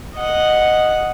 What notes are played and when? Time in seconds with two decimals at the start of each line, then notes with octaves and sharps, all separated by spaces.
0.15 D#5 F#5